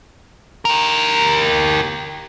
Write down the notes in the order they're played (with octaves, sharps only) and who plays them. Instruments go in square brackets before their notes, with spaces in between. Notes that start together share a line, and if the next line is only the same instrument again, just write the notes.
[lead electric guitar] G4 A#4